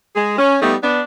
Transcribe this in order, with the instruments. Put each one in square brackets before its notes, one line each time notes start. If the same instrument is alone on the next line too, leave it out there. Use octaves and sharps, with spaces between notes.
[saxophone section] G#3 G#4
C#4
G3 A3 B3 D#4
B3 D4